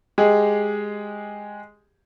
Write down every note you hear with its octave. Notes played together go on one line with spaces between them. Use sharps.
G#3 G4 G#4